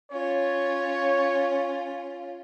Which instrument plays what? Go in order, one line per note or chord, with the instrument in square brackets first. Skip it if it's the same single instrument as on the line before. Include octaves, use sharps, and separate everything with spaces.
[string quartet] C#4 F4 [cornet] C#5